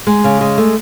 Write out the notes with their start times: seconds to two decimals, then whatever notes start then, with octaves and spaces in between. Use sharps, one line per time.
0.07 G#3
0.24 C#3
0.41 G#3
0.58 A3